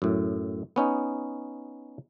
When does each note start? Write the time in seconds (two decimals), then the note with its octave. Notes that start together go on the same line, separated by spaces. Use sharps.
0.02 F#2 A2
0.76 B3 C#4 D#4